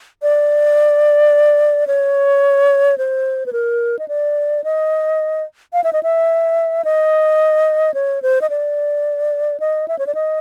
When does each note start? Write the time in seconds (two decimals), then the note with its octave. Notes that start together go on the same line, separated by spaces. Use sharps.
0.22 D5
1.87 C#5
2.98 C5
3.46 B4
3.53 A#4
3.99 D#5
4.08 D5
4.64 D#5
5.73 F5
5.84 E5
5.93 D#5
6.03 E5
6.85 D#5
7.94 C#5
8.22 C5
8.42 D#5
8.50 D5
9.60 D#5
9.88 E5
9.99 C#5
10.07 D5
10.15 D#5